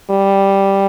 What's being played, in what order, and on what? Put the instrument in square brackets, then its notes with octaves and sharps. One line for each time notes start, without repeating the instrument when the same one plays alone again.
[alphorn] G3